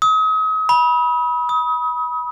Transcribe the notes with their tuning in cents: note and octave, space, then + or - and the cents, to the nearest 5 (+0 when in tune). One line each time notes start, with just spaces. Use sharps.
D#6 +40
B5 -25
D#6 +30